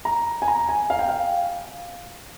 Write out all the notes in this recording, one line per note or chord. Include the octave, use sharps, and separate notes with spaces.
A#5
G#5
A#5
G#5
F5
G5
F5